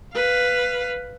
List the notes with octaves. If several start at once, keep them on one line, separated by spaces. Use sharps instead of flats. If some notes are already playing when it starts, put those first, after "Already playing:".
B4 F5